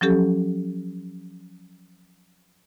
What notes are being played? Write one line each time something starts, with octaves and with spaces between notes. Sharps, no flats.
F3 F#3 C#4 G4 A4